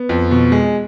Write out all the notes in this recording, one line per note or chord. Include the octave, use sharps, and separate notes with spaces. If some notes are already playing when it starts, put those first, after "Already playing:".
Already playing: B3
F2
B2
G#3